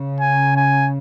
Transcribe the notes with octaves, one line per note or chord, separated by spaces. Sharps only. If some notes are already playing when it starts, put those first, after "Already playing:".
Already playing: C#3
G#5
G#5